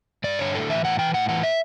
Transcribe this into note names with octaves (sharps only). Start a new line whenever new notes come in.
G2 D5
D3 C#5
A2 A4
E3 E5
A2 F#5
E3 G5
A2 F#5
E3 F#5
E5